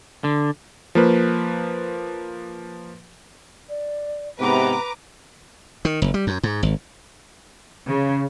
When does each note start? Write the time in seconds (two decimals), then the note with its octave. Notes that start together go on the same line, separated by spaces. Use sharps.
0.24 D3
0.95 F3 A#3 B4
3.69 D5
4.40 G#2 C3 B3 B4 A#5 D6
5.85 D#3
6.02 F#1
6.14 G3
6.27 F#2
6.43 G#2
6.63 G#1
7.88 C#3